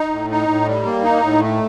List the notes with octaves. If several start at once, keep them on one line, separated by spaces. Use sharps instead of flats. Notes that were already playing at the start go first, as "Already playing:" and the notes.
Already playing: D#4
A2
D#4
A2
G3
A#3
D#4
A2
A3